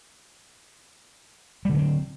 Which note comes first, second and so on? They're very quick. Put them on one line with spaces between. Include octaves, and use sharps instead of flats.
G3 D3 F#3 C4